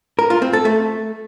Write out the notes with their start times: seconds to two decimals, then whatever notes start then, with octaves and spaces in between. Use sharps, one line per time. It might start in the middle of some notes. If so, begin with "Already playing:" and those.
0.19 A#4
0.30 F4
0.42 C4
0.53 A4
0.65 A3